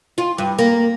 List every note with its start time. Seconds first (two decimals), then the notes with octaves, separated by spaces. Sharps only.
0.18 F4
0.38 G2
0.59 A#3